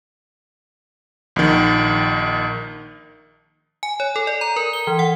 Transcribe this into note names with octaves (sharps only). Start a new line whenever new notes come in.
A#1 D#3
G#5
C#5
A4
D5
A#5
A#4
G7
E3
F#5